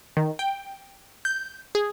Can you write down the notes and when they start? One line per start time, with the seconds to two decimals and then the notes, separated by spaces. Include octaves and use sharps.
0.17 D#3
0.39 G5
1.25 G6
1.75 G#4